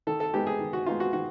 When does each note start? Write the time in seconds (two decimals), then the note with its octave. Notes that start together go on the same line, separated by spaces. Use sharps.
0.07 D#3 A4
0.20 A4
0.33 G#3 B3 D#4 G4
0.47 G#4
0.60 D#3
0.73 F#4
0.86 G#3 B3 D#4 F4
1.00 F#4
1.13 D#3 F#4